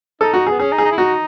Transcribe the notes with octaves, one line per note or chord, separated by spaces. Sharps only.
D#4 A4
F#4
B3 G#4
C#4 G#4
D#4
G#4
D#4
E4
D#4 F#4